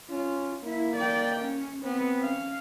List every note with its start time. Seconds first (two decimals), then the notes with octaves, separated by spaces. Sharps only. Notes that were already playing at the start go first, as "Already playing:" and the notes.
0.10 C#4 F4
0.64 A#3 E4
0.97 D5 G5
1.41 C#4
1.83 B3 C4
2.20 C#4 F5